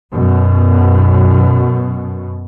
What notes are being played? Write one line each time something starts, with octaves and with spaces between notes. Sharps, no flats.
F#2 B2